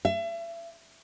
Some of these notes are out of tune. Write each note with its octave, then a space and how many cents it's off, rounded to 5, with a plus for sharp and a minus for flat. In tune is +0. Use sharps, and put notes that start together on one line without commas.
E5 +35